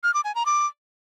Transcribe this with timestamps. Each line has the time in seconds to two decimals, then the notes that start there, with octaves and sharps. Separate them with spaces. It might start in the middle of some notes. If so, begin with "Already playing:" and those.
0.03 F6
0.14 D6
0.24 G#5
0.35 A#5
0.46 D6